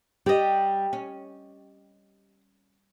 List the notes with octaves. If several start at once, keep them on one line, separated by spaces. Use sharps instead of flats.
G3 G4 D#5
C#4